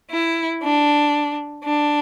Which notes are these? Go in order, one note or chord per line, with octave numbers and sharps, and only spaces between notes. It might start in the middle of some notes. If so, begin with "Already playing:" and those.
E4
D4
D4